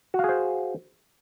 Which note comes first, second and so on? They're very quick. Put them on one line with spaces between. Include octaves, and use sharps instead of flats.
F#4 F5 G#4 C5